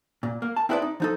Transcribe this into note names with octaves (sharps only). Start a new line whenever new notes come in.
A#2
A#3
A5
C4 E4 G#4 B4 C#5 D5
D#4
F3 D#4 A4